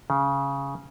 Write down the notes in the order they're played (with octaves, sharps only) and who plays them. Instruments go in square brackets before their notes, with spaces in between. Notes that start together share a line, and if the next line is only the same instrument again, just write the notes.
[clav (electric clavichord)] C#3